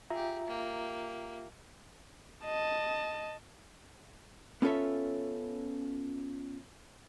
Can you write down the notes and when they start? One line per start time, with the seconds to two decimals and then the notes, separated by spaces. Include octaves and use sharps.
0.10 F4 G4 G#4 E5 A#5
0.47 A#3 G4
2.45 D#5 A5
4.62 B3 C#4 F4 A4 C#5 E5